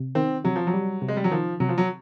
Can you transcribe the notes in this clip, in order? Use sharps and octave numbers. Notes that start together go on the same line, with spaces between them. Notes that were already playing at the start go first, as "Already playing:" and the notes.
Already playing: C3
D#3 C4
C3 F#3
F3
F#3
G3
C3
G#3
G3
F#3
D#3 F3
C3 F#3
F3
F#3